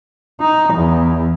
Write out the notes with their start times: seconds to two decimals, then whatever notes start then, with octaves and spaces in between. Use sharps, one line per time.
0.41 D#4
0.73 E2